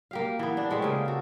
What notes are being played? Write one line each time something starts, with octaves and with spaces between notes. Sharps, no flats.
A#3 G4 F5
E3 B3
D4
F3 G#3 A3 G4
C#3 A#3
F#4 A4